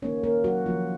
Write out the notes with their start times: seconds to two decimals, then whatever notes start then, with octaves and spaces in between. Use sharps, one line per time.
0.02 D#3 A#3 C#4 C#5
0.23 A#3 A#4
0.44 F#3 F#4
0.66 D#3 F3 A#3 F4